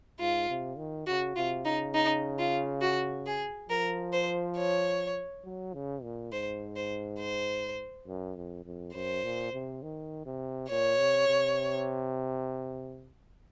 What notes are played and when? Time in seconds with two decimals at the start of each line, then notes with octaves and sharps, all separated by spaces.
0.20 G#2 F4
0.49 C3
0.77 D#3
1.07 C#3 F#4
1.36 C3 F4
1.65 C#3 D#4
1.94 D#4
2.39 F4
2.81 F#4
3.26 G#4
3.69 F3 A#4
4.13 C5
4.57 C#5
5.44 F#3
5.74 C#3
6.03 A#2
6.32 G#2 C5
6.76 C5
7.19 C5
8.07 F#2
8.36 F2
8.65 F2
8.94 F#2 C5
9.23 A#2
9.53 C3
9.83 D#3
10.26 C3
10.70 A#2 C#5
10.99 C3
11.28 C3